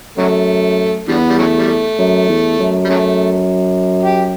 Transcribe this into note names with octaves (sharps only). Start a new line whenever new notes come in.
F#2 C#3 F#3 A3
E2 D3 G3 B3
G3
C#3 F#3 A3
G3
A3
F#2
E2
F#2
G3
C#3 F#3 A3
G4